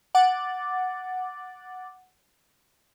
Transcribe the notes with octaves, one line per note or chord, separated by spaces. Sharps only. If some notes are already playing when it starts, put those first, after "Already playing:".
F#5 D6 A6